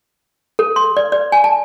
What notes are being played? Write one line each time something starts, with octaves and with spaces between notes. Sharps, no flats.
A4
C6
D5
D5
G#5
A5